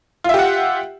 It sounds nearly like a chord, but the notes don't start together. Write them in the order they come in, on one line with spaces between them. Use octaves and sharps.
F4 E5 G4 F#5